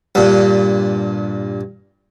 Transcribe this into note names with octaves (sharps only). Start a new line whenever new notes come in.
G2 A#2